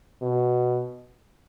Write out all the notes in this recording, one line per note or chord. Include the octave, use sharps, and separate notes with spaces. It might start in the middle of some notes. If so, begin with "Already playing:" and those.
B2